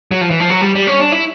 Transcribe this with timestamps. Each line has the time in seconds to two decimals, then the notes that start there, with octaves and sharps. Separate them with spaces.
0.11 F#3
0.21 F3
0.30 E3
0.40 F3
0.50 F#3
0.62 G3
0.75 G3
0.87 C#4
1.00 D4
1.12 E4